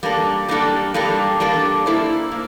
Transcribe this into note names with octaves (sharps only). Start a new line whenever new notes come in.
G3 A#3 D4 A4
G3 A#3 D4 A4
G3 A#3 D4 A4
G3 A#3 D4 A4
A#3 E4 A4 C5
A#3